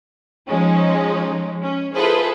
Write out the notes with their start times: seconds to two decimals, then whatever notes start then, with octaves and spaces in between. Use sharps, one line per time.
0.48 F3 G#3 C#4 D#4
1.62 C#4
1.95 E4 F4 G#4 A4 B4 C5